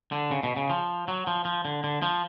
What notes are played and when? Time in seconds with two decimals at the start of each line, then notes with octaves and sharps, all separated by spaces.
0.12 D3
0.31 C#3
0.43 B2
0.56 C#3
0.70 F3
1.08 F#3
1.27 F3
1.45 F3
1.65 D3
1.84 D3
2.02 F3